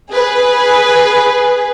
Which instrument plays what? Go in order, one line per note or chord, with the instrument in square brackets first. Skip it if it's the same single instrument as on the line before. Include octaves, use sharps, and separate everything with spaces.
[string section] G#4 B4